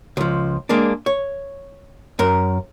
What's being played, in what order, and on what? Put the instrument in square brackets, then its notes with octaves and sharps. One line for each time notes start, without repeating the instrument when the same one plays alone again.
[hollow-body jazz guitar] C#2 F3
G#3 A#3 D4
C#5
F#2 A#4